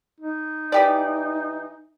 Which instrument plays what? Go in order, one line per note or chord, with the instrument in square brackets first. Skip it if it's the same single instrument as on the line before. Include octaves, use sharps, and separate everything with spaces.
[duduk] D#4
[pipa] E3 G4 D5